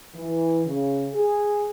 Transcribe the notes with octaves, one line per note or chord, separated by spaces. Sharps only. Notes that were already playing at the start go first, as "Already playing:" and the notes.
E3
C#3
G#4